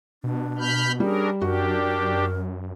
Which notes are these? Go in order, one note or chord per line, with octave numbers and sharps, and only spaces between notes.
B2 D4
B5 F6 G6
G3 C#4 D4 G#4 A#4
F#2 D4 F#4 G4 A#4